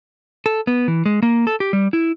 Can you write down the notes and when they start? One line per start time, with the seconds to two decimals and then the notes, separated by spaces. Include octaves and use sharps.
0.46 A4
0.67 B3
0.88 E3
1.06 G#3
1.23 A#3
1.47 A4
1.60 G4
1.73 G3
1.93 E4